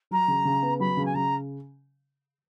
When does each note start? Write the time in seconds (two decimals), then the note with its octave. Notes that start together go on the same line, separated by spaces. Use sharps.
0.11 F#3 A#5
0.28 C#3
0.45 C#3
0.63 B3
0.80 F#3 B5
0.97 C#3
1.05 G#5
1.14 C#3 A#5